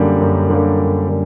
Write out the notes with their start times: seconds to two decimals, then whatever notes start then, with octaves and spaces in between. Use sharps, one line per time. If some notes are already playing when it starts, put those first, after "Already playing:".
Already playing: F#2 D3 G3 A#3
0.21 F#2
0.49 D3 G3 A#3
0.79 F#2
1.08 D3 G3